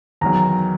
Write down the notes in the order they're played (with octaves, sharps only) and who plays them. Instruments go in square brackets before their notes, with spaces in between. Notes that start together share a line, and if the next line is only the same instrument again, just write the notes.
[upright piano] E2 D#3 F#3 A#5